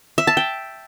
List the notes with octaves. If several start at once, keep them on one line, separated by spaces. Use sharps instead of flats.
E5
A5
G5